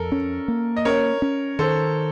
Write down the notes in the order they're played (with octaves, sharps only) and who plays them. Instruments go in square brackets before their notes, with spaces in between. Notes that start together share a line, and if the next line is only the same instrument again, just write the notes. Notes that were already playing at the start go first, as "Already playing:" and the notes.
Already playing: [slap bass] F2 [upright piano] A4 A#4
[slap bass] C#4
A#3
[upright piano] D#5
[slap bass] C#4 [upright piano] A#4 C#5
[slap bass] C#4
[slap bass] D#3 [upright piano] A4 C5